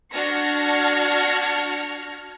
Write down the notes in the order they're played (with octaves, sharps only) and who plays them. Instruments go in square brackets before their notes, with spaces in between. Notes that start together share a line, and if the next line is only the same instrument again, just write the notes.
[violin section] D4 F#4 F6 G#6 A#6 C#7